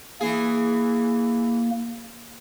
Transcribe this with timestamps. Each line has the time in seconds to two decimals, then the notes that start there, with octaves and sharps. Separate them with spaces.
0.21 E3 A#3 G#4